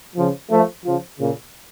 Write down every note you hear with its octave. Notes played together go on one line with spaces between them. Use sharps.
C#3 F3
F3 A3
C#3 F3
A#2 C#3